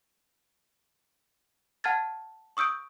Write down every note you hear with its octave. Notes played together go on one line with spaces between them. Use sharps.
F#5 A5 F6 G#6 A6
C#6 D#6 E6 G6 D7